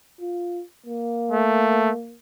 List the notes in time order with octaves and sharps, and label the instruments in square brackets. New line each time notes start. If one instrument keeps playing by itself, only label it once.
[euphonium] F4
A#3
[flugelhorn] A3